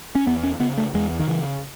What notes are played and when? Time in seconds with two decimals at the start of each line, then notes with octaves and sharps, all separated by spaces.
0.15 C#4
0.27 E2 B3
0.43 C#4
0.60 C#3 B3
0.78 A3
0.94 E2 G#3
1.19 D#3
1.28 C#3 E3